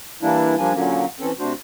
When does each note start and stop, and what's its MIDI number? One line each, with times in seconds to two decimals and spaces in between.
0.22 0.55 52
0.22 0.55 55
0.22 0.55 58
0.22 0.55 62
0.22 0.55 64
0.58 0.73 53
0.58 0.73 55
0.58 0.73 58
0.58 0.73 62
0.58 0.73 80
0.74 1.05 46
0.74 1.05 50
0.74 1.05 54
0.74 1.05 58
0.74 1.05 61
1.20 1.32 52
1.20 1.32 60
1.20 1.32 61
1.20 1.32 69
1.39 1.53 48
1.39 1.53 57
1.39 1.53 62
1.39 1.53 66
1.39 1.53 72